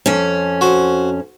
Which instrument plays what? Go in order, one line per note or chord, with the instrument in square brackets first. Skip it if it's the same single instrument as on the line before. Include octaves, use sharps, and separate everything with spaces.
[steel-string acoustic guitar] F2 C#4
[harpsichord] F#4 C5